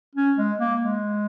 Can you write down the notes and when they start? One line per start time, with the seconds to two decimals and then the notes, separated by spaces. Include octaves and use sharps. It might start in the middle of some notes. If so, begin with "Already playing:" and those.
0.15 C#4
0.38 G#3
0.60 A#3
0.81 G#3